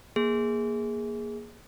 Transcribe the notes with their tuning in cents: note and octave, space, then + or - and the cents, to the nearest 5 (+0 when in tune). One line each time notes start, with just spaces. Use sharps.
A#3 +10 G#4 +0